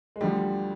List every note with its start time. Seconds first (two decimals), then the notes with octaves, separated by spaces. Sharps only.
0.16 G#3
0.21 D2 D3 F3 G3